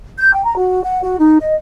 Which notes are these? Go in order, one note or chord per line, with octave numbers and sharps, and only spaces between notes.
G6
G5
A#5
F#4
F#5
F#4
D#4
D#5